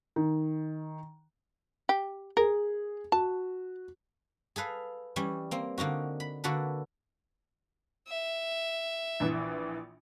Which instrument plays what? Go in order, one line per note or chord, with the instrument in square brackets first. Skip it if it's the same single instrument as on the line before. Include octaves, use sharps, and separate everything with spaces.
[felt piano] D#3
[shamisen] G4
[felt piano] G#4 [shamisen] A#4
[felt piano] F#4 [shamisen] A5
[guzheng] G#4 A4 B4 F5
E3 G3 C#4
A#3 C4
D3 A#3 D#4 F#4
B5
D3 A#3 F#4 A4 B4
[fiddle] E5
[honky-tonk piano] A#1 E3